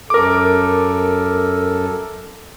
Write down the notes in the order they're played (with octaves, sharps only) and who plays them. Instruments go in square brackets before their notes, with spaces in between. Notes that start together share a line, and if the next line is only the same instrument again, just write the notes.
[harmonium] F#2 A4 [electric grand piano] A#4 D6